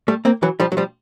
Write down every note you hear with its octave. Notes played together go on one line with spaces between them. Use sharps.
G3 A3
A#3 C4
E3 F#3
F3 G3
F#3
F3 G3